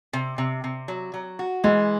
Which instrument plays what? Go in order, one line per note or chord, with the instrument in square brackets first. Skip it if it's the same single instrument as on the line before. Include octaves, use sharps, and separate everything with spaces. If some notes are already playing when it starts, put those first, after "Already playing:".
[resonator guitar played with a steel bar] C3
C3
C3
F#3
F#3
F#4
[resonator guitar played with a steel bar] E3 [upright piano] G#3